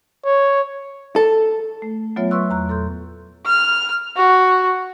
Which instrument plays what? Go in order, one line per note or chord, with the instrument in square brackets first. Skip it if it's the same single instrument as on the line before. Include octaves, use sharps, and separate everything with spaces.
[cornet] C#5
[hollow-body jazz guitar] A4
[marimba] A3
F#3 A3 B3 F4 C#5 E5
B4 E5 C6 C#6 E6 F#6
E2 A#5 F#6
A#2 A4 C6 G6
[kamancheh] F6
F#4